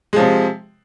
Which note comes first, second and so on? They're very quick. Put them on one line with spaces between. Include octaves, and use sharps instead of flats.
G#3 F3 C3